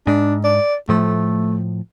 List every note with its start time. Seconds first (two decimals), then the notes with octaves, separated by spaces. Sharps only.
0.07 G#2 D4
0.44 D5
0.89 A2 F3 A3